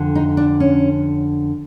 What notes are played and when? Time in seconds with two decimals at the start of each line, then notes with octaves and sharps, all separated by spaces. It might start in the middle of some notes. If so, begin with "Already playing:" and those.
Already playing: F2 D3
0.15 D#4
0.37 D4
0.60 C#4